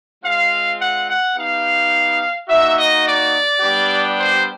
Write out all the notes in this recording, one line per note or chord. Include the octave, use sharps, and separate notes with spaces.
G#3 C4 F4 F5
F#5
F#5
B3 D#4 G4 F5
A#3 D#4 F#4 E5
D#5
D5
G3 B3 D4 G4
C5